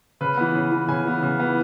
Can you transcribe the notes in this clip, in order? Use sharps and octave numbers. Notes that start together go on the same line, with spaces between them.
C#3 B4
E3 B3
C#3
E3 B3
C#3 G#5
E3 B3
C#3
E3 B3